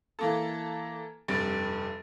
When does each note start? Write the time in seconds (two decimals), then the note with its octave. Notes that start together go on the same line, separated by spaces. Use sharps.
0.19 E3 A#3 A4
1.28 F1 G2 C3 A6 D7